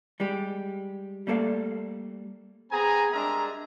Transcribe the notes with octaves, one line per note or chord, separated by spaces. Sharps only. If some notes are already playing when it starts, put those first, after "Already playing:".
G3 G#3 G4
G3 A3 A#3 A4 D5 F5
B3 C4 G#4 G#5 A#5
G3 G#3 D4 A#4 E5 A#5